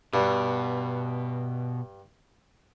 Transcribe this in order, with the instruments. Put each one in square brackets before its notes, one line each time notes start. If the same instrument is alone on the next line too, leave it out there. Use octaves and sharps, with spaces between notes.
[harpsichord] G2 [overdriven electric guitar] B2